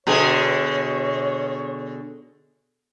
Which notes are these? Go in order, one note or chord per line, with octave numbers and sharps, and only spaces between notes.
B2 D3 G#4 C#5